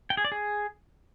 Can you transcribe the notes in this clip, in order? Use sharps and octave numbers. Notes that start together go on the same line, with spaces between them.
G5
G#4
D5
G#4